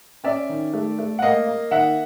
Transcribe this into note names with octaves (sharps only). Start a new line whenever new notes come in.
C#4 D5 E5
D#3
A3
A3
F#5
A#3 D#5 F5
A#3
D#3 E5 F#5